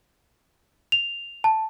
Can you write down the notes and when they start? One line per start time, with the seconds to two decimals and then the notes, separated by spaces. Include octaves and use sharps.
0.92 F7
1.44 A5